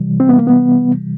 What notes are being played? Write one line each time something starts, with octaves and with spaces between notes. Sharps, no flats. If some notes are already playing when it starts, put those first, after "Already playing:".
Already playing: C3 E3 G3
C4
B3
A#3
B3